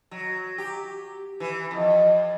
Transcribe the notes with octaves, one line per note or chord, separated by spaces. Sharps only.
F#3
G4
E3
F2